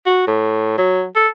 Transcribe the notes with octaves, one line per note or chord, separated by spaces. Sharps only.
F#4
A2
F#3
A4